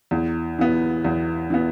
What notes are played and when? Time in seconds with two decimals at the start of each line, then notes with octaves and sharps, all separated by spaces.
0.11 E2
0.59 E3 B3
1.05 E2
1.50 E3 B3